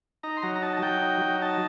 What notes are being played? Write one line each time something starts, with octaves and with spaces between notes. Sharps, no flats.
D#4 A#5
C6
F#3 A#5
A#5
D#4 A5
A5
F#3 G5
D#4
F#3
D#4 A5